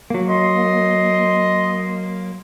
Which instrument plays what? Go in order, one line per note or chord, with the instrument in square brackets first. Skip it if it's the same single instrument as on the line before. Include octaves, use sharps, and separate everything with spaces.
[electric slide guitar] F#3 A#3
[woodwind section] D#5 C6